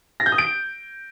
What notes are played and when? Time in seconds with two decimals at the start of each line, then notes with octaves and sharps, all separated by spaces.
0.20 A#6
0.26 G6
0.32 D#6
0.38 D7